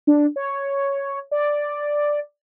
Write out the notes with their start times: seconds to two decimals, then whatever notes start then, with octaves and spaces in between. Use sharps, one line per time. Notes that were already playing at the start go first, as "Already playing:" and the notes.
0.07 D4
0.36 C#5
1.31 D5